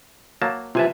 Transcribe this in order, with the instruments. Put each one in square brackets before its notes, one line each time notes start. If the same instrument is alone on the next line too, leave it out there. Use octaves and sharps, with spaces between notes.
[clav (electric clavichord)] F#3 A#3 A5
[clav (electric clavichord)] C3 G#5 A5 [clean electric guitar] F4 B4 E5